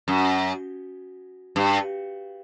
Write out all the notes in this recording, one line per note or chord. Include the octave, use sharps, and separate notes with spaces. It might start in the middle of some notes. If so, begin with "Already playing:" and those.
F#2
G2